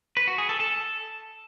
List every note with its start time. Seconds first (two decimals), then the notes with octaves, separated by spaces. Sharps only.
0.17 B4
0.27 F#4
0.38 G#4
0.49 A4
0.60 A4